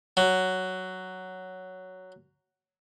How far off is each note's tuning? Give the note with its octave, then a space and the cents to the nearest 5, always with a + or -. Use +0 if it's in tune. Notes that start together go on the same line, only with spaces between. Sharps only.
F#3 +5